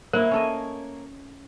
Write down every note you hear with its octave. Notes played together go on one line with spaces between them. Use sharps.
A#3 E4 A#4 C5 C#5 F#5
C#4 A4 D#5